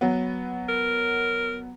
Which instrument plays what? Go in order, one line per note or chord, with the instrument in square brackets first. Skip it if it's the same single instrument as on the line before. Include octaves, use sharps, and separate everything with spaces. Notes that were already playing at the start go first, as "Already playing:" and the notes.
[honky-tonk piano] F#3 B3
[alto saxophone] A#4